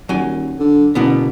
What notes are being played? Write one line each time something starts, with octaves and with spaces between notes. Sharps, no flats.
D#1 F#3 G#5
D3
F#1 B2 D3 B3